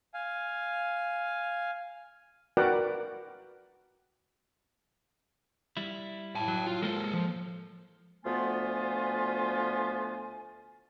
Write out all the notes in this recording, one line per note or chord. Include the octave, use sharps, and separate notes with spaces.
F5 G#5
F#4 A#4 B4 D5 F#5 G5
G3 E4
A2 G5 A5
F#3
F4
G#3 A#3 A4 A#4 C5
F3
D2 F3 A3 B3 F4 G#5